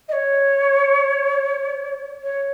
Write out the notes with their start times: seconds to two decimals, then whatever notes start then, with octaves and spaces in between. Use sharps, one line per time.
0.08 D#5
0.12 C#5
2.22 C#5